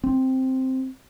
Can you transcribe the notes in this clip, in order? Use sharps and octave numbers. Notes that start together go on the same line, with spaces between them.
C4